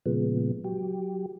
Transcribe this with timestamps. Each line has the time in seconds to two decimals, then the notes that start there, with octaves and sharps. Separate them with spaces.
0.06 A#2 C#3 F3 G#3 B3
0.64 F#3 G4